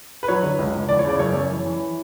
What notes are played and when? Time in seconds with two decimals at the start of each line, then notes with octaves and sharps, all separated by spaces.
0.23 B4
0.28 F#3 C#5
0.43 D3
0.59 C#2
0.74 C#2
0.89 E2 D5
0.99 C#5
1.04 C#3 D5
1.19 F#2 C#5
1.34 F#2
1.50 E3
1.65 E3